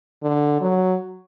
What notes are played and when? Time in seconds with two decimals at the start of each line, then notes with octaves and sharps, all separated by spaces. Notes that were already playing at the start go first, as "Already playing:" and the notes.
0.23 D3
0.61 F#3